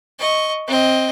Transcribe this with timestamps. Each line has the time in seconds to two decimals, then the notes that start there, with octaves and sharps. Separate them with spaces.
0.19 D#5 C#6
0.68 C4 D#5